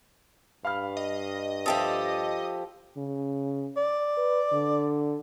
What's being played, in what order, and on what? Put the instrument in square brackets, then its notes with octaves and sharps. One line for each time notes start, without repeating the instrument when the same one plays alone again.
[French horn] G2 [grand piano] F5 B5 F6
[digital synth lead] D#5
[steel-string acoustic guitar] F3 G4 A4 [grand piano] E5 A5 D#6
[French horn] C#3
[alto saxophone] D5
[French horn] B4
D3